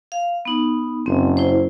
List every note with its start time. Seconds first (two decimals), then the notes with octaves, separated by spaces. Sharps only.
0.12 F5
0.45 B3 D#4
1.06 F#1 C4
1.37 E4 C5